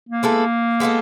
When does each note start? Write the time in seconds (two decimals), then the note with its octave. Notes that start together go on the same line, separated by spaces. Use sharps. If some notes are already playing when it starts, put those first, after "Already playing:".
0.09 A#3
0.23 G#3 B3 E4 A4
0.80 G#3 B3 E4 A4